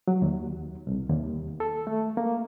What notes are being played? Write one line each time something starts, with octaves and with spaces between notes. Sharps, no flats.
F#3
D#2
C2
D#2
A4
A3
A#3